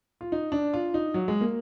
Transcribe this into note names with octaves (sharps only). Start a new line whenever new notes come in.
F4
D#4
D4
F4
D#4
F#3
G#3
A#3